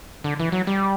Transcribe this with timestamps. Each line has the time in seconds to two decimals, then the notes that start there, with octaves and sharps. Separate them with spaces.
0.24 D3
0.40 E3
0.52 F#3
0.67 G3